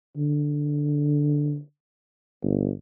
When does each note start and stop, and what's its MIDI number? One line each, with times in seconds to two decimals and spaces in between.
0.17 1.59 50
2.43 2.71 31